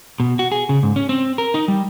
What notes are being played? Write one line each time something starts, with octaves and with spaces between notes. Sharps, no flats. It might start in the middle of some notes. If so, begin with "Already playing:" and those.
B2
F#4
G#4
C#3
G#2
C#4
C4
A#4
D#4
G3